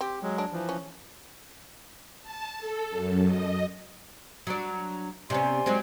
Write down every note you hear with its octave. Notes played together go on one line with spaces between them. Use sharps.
C4 G4
F#3 G#3
D4
E3 F3
C#4
A5
A4
F#2
D#5
F#3 D4 A#5
C3 B3 C#4 D5 G#5 C6
F#3 G#3 C4